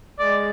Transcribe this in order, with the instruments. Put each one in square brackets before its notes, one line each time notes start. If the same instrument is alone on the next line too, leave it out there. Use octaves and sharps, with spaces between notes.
[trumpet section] G#3 [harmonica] D5